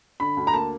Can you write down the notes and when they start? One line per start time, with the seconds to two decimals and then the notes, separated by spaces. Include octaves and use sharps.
0.20 D3 B5
0.37 D2
0.47 A#5
0.54 A#3 A5